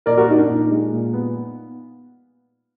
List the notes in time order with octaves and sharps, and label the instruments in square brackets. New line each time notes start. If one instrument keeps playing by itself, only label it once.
[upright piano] A#2 A#4 D5
F#4 A#4
D4 D#4
D4
A#2 D#4
G#3
A#2
B3